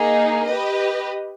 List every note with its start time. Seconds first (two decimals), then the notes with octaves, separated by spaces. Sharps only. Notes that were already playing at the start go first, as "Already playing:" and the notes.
Already playing: A#3 D#4 G#4
0.47 G4 B4 D#5